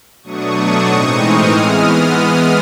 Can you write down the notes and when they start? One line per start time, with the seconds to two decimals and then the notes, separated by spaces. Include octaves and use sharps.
0.23 B2 F#3 A3 D4 C#6 D#6
0.86 A2 E3 G#3 C4 D#4
1.18 D#6 F6
1.50 E3 G#3 B3